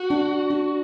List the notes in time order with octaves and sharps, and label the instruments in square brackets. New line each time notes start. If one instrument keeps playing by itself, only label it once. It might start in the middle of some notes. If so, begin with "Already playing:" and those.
Already playing: [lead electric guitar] F#4
[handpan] D4
D4